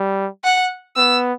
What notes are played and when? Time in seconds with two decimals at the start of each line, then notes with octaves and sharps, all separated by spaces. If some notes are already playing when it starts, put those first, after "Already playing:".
Already playing: G3
0.44 F#5
0.96 B3 E6